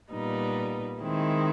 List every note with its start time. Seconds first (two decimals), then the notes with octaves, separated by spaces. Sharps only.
0.10 A#2 G3 B3 D#4
1.01 D#3 G#3 C4 E4